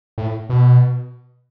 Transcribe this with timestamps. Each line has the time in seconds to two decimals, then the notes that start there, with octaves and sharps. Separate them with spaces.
0.18 A2
0.50 B2